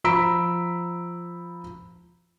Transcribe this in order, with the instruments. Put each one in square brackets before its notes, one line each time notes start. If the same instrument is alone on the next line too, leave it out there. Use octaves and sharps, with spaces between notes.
[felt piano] F3 A#5 B5 E6 B6 D7